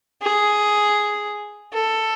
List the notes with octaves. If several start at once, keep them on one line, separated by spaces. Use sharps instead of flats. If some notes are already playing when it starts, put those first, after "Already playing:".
G#4
A4